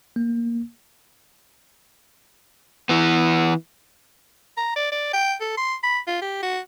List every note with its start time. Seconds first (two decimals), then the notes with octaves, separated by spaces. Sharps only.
0.16 A#3
2.89 E3 B3
4.57 A#5
4.76 D5
4.92 D5
5.13 G5
5.40 A4
5.57 C6
5.83 B5
6.07 F4
6.21 G4
6.42 F#4